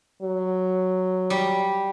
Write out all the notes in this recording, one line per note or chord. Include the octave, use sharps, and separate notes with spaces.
F#3
G3